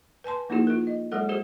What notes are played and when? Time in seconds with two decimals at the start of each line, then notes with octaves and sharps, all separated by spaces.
0.24 B4 G#5 A5 C6
0.49 F3 A#3 D#4 E4 F#4 G#4
0.67 F4 A#4
0.87 D#5
1.11 F#3 G#3 A4 A#4 F#5
1.29 F#4 G#4 C5